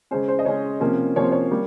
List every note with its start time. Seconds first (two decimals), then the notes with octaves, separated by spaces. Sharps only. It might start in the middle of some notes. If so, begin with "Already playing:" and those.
0.11 C#3 G#3 C#4 C5
0.28 C5
0.39 D#5
0.45 C#3 G#3 C#4 C#5
0.80 C3 F3 A#3 C#4
1.16 C3 F3 A#3 C#4 C#5
1.24 C5
1.32 C#5
1.51 G3 A#3